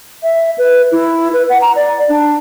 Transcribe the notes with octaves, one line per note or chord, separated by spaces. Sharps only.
E5
B4
E4
B4
F#5
A#5
D5
D4